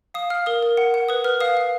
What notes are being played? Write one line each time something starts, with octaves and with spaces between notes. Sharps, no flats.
F5 D#6
F5 F6
A#4 D#6
A#4
F#5
F#5
B4 D#6
B4 F6
F5 D#6
F5